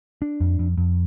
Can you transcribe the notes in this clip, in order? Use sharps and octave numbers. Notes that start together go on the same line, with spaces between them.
D4
F2
F2
F2